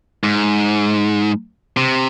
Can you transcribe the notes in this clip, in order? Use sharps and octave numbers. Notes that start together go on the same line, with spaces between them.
G#2
C3